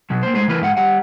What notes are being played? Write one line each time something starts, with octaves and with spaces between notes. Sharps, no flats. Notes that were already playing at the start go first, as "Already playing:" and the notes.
B2 F#3
A#3 C5
G#3 A3 C5
E3 A3 A#4 B4
G#2 F5 F#5
G3 F#5